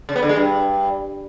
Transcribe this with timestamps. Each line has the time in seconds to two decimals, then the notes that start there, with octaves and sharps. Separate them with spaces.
0.09 C#3
0.16 B3
0.22 D3
0.29 G#3
0.36 G2